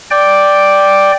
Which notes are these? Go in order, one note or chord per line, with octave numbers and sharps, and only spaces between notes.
D5 G5